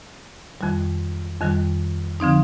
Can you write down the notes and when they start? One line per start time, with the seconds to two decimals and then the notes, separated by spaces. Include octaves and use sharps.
0.61 F2 D#3 G3
1.41 F2 D#3 G3
2.20 D3 F3 C4 D#4